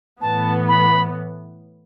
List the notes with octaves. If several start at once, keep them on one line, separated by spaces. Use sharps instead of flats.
A2 E3 B3 A5
B5